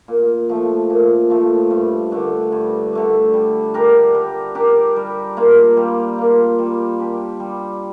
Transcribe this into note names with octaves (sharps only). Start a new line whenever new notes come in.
A#2
F3 A3
A#2
F3 A3
G2
D3 A3 D4
G2
D3 A3 D4
G3
D4 G4 A#4
G3
D4 G4 A#4
G3
A#3 F4
G3
A#3 F4
G3
D4 G4
G3